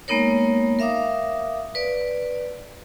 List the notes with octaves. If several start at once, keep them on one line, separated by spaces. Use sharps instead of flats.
G#3 A#3 B3 D#4 A#4 C#5
A#4 E5 F5 D6 D#6
B4 D5